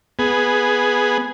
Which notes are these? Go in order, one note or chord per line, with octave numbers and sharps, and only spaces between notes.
B3 G#4